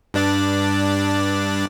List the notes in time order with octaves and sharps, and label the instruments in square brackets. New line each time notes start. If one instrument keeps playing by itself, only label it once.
[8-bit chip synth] G2 D4 D5